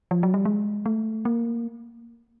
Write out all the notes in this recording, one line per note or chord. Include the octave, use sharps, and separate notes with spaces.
F3
F#3
G3
G#3
A3
A#3